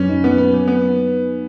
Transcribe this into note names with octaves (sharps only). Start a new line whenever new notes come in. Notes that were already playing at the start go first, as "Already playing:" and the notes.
Already playing: F#2 F#3 C#4 B4
D#4
F#3 B3
B4
F#3
B3